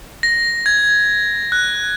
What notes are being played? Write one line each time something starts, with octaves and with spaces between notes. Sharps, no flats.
A#6
G#6
F#6